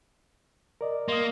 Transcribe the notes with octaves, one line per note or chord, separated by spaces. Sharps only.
A#4 D5 D#5
A#3 C6 D#6